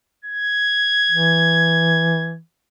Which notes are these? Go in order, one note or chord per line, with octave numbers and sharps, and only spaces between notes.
G#6
E3